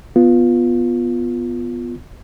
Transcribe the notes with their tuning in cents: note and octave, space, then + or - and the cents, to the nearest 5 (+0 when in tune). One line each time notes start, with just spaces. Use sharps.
B3 +0 F4 +0